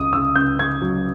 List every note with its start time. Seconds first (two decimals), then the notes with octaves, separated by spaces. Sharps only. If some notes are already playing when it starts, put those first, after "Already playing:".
Already playing: C#2 C#3 D#6
0.13 C#3 E6
0.35 C#2 G6
0.58 C#3 G#6
0.82 F#3